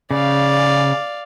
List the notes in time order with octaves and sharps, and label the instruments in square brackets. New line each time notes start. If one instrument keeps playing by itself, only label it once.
[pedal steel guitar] C#3 [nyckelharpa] D5 F5